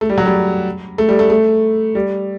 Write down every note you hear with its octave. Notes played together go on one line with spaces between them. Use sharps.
A3
G3
F#3
G3
A3
G3
A3
A3
G3